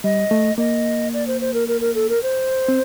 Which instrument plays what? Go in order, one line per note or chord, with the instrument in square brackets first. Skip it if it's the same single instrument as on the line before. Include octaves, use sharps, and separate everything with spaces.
[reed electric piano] G3 [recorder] D#5
[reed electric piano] A3
[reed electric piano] A#3 [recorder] D#5
[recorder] D5
C5
C5
A#4
A#4
A#4
A4
A#4
C5
[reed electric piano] C4